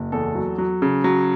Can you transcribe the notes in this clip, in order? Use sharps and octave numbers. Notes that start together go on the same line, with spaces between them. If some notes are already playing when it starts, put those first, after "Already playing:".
Already playing: F#1
E2 A4
F#3
F#3
C#3
F#3